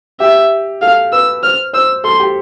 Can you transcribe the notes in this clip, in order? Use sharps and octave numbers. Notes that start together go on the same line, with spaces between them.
G4 E5
A4 F5
B4 E6
C5 F6
C5 E6
A4 C6
G4